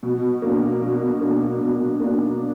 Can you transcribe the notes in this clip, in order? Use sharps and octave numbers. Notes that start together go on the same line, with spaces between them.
B2
A#3 D4
B2
A#3 D4
B2
A#3 D4